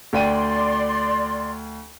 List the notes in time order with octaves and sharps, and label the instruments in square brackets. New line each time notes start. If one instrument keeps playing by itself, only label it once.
[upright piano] D2 G5 D#7 [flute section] D5 C6